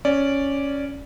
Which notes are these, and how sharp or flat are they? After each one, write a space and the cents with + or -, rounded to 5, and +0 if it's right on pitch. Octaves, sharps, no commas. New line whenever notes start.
C#4 +0 D5 -10